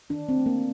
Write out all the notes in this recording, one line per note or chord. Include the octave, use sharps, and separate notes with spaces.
D#3 D4
C4
A3
A#3